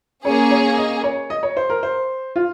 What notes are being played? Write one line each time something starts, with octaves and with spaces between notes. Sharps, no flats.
A#3 C#4 G#4 C#5
C#5
D#5
C#5
D#5
C#5
C5
A#4
C5
F4